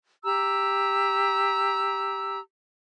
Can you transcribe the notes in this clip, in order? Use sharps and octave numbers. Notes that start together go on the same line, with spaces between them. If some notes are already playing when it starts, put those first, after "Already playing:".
G4 A#5 E6